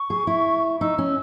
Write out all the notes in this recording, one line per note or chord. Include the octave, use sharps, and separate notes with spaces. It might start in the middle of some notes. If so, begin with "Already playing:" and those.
Already playing: C#6
G#4
E4
D#4 E6
C#4